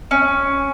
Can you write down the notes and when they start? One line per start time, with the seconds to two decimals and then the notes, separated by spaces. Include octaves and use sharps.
0.11 C#4